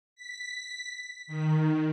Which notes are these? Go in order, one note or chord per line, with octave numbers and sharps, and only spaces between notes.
B6
D#3